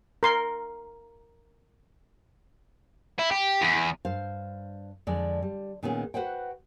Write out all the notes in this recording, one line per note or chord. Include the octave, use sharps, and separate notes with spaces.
A#4 C6
E4
G4
E2
G2 C5 F5
F2 D3 G#3 D5
G3
A#2 D#3 B3 C#4 G#4
F#4 B4 C5 F#5 G5